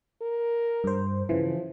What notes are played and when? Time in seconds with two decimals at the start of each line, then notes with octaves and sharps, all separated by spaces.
0.22 A#4
0.84 G2 C5
1.29 C#3 E3 F3